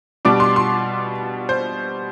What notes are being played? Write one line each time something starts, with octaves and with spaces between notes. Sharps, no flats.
B2 G3 D4 D6
C6
C6
C5